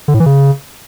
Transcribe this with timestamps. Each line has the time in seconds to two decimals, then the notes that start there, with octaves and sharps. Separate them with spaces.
0.08 D3
0.14 A2
0.20 E3
0.26 C#3